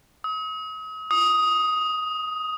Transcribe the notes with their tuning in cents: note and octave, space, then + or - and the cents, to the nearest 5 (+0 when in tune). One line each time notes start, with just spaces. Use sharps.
D#6 +40
D#6 +10